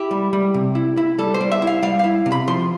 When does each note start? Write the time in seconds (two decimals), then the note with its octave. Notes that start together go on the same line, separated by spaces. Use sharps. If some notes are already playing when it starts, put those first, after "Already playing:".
Already playing: E4 G4
0.11 G3
0.33 G3
0.54 C3
0.75 E4
0.97 E4
1.18 G3 A4
1.34 C5
1.41 G3
1.51 E5
1.62 E4
1.67 F5
1.83 G3 F5
1.99 E4 F5
2.26 C3
2.32 B5
2.48 F3 C6